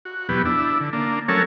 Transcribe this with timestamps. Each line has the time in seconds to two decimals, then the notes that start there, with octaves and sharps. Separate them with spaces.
0.05 F#4
0.29 E2 B2 F#3 B3 G4
0.45 D4 E4
0.81 D3
0.93 A#3 D4
1.28 F#3 A3 C#4 A4 A#4 C#5